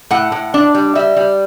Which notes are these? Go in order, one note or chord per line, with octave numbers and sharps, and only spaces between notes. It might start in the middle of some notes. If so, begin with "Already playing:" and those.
A2 F#5
A2
D4
G3
G3 E5
G3